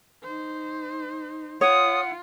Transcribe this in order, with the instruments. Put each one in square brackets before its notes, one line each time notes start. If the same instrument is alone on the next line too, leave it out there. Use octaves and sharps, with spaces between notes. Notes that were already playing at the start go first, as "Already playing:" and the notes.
[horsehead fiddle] D#4 C5
[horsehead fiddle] F4 [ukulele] C#5 [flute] F#5 [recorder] D#6